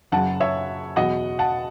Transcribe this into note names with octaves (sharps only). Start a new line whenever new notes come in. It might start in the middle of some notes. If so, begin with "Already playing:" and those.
F#1 F#2 C#3 F#5 A5
C#5 E5
E2 B2 F#3 B3 D#5 F#5
F#5 A5